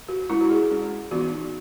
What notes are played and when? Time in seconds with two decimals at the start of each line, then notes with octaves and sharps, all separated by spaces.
0.09 F#4
0.30 G#3 C#4 E4
0.41 F#4
0.50 G#4
0.70 G#3 C#4
1.11 E3 B3 D#4 F#4